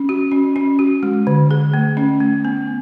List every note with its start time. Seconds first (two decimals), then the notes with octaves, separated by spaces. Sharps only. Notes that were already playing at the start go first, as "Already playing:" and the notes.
Already playing: C#4
0.09 F#4
0.31 C#4
0.56 C#4
0.79 F#4
1.03 G#3
1.27 D3
1.51 G#4
1.74 A3
1.97 C#4
2.20 A3
2.45 B3